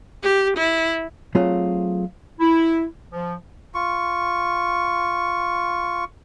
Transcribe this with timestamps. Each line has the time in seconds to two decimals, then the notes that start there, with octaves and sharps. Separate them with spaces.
0.23 G4
0.56 E4
1.35 F#3 A3 C4 F4 G#4
2.40 E4
3.13 F3
3.74 F4 C#6